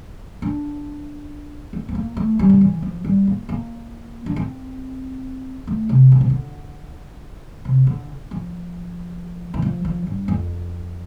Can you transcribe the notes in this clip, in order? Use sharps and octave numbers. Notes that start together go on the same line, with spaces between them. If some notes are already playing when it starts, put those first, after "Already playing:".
D4
C4
C4
A#3
A3
G3
D3
E3
F3
G3
A#3
A#3
D4
C4
A3
C3
D3
C3
D3
C3
D3
F3
E3
F3
F3
G2
F2